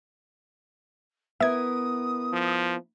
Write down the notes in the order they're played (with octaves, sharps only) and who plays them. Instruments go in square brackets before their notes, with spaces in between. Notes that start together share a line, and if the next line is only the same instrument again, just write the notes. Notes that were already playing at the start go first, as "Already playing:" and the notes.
[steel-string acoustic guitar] B3 E4 A#4 [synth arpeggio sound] E5 G#6 [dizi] D#6
[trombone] F3